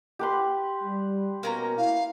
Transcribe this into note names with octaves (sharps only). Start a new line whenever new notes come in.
G4 B4 C6
G3
B2 A#3 C#4 A#5
E4 F5